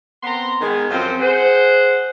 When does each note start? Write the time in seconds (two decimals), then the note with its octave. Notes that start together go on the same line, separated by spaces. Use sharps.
0.23 B3 C4 A#5 C6
0.61 D#3 G#3 B3
0.90 F#2 F3 C4 F4 A4 C5
1.20 G#4 C5 F#5